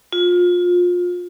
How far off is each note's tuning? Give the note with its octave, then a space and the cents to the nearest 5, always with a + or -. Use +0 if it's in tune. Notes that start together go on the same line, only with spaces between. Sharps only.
F4 +25